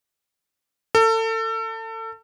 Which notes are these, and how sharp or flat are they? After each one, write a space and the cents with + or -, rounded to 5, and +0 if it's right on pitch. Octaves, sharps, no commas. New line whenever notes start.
A4 +30